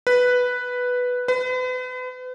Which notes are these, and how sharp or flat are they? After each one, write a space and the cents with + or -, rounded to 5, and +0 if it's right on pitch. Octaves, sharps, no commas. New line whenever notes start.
B4 +0
B4 +40